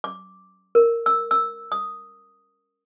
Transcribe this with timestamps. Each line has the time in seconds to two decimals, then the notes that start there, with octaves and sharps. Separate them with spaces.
0.04 D6
0.75 A#4
1.06 E6
1.31 E6
1.72 D#6